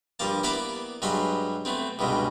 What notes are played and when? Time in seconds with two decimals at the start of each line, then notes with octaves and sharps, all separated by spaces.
0.19 G2 F3 A#3 A5
0.43 A#3 B3 E4 D5 A5 B5
1.02 G2 F#3 G#3 B5 C6
1.65 A3 B3 C4
1.99 C#2 G2 B2 G#3